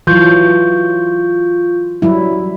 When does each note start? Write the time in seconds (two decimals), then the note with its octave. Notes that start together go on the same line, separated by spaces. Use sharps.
0.07 E3 F#3 F4 C#6 G6
2.02 F#3 G3 E4